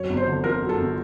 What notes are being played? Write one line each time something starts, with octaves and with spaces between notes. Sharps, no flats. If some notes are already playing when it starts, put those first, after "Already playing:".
Already playing: F#2 C#5
G1
C5
D3
F3 A#4
F#2
A4
G1